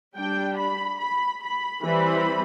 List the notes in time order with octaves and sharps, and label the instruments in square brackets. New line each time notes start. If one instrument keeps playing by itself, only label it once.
[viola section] G3 D4 G5
B5
B5
B5
E3 G3 C4 B5